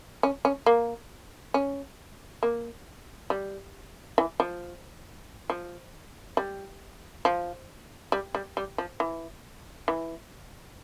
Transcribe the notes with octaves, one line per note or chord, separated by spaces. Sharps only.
C#4
C#4
A#3
C#4
A#3
G3
E3
F3
F3
G3
F3
G3
G3
G3
F3
E3
E3